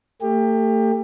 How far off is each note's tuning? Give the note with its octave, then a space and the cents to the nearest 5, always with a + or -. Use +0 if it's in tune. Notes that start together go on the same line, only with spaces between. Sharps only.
A3 +35 G4 +25